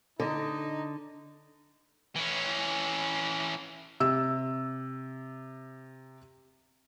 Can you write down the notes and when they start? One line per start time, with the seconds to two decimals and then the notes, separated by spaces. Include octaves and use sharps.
0.20 D3 D#4
2.16 E3 C#4
4.00 C3 E6